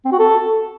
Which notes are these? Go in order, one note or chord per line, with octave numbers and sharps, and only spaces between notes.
C4
F#4
A4